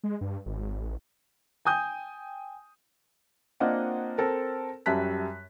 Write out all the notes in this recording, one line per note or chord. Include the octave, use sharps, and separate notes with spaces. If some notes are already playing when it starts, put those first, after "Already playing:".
G#3
G2
G#1
A1
G5 G#5 D#6 G6
A#3 C4 D4 F4 D#5 F#5
C4 A4 A#4
F#2 G3 E5 A5 F#6 B6